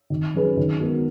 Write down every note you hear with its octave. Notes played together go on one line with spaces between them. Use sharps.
D#3
F#3 C#4 G#4 B4
D#3
G#3 B3 F#4 A#4